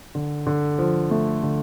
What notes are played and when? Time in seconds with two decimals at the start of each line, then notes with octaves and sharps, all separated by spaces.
0.15 D3
0.47 D3
0.79 F3
1.11 A3
1.43 D3